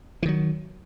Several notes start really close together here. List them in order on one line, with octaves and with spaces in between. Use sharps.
E3 D#3 F#3